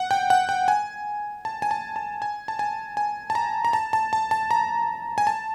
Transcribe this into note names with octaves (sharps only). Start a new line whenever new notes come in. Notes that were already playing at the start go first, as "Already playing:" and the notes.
Already playing: F#5
G5
F#5
G5
G#5
A5
G#5
A5
A5
G#5
A5
G#5
G#5
A5
A#5
A#5
A5
A5
A5
A5
A#5
G#5
A5